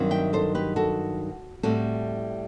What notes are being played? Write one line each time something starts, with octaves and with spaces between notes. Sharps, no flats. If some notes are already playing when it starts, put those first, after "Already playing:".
Already playing: G2 D#3 F#3 C4
E5 G5
A4 C5
G4 B4
F#4 A4
A2 G3 C4 F#4 A4